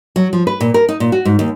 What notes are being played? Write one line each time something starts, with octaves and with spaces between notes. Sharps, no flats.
F#3
F3
B4
A#2
A#4
D#4
A#2
F#4
G#2
D#2